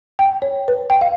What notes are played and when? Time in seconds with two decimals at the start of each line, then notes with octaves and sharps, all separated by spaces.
0.19 G5
0.42 C#5
0.68 B4
0.90 G5
1.01 F5